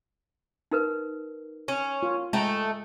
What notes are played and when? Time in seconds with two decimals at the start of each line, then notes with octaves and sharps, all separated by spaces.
0.72 D#4 A#4 B4
1.68 C#4
2.03 F4
2.33 G#3 A3 G5 A#5